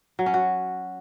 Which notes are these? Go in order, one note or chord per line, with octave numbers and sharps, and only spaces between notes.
F#3
C#4
F#4